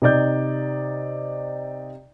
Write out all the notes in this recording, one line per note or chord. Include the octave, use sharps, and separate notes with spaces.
C3 D#4 D5 G6